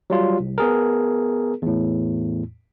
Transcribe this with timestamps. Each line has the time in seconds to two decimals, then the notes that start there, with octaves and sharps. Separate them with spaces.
0.10 F#3 G3 F4
0.40 C2
0.58 B3 G#4 A#4
1.62 E2 A2